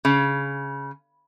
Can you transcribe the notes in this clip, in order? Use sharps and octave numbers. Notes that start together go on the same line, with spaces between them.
C#3